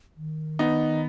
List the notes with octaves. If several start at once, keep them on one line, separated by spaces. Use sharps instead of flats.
D#3
B3 D#4